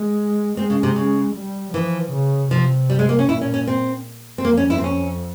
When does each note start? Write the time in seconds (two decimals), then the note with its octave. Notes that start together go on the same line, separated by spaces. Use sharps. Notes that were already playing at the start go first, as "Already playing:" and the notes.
Already playing: G#3
0.57 G#3 C4
0.70 C#3
0.83 C3
0.96 C#3
1.35 G3
1.73 E3 F3
2.12 C#3
2.50 C3 F3
2.90 G3
2.99 G#3
3.09 A#3
3.19 C#4
3.28 A#2 E4
3.41 C#4
3.54 C#4
3.67 C4
4.38 C4
4.45 F2 A#3
4.57 C#4
4.70 E4
4.78 C4
4.84 C#4